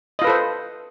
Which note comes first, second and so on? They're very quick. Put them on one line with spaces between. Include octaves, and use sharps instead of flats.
D#5 F4 B4 A4 C5